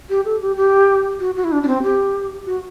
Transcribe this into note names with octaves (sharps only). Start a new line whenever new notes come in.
G4
A4
G4
G4
F#4
F#4
E4
D4
D4
C4
G4
F#4